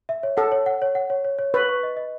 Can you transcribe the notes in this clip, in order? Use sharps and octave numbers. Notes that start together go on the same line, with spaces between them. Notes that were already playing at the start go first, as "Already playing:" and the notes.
E5
C#5
A4 F#5
C#5
F#5
C#5
F#5
C#5
C#5
C#5
B4 C#6
C#6
D#5
D#5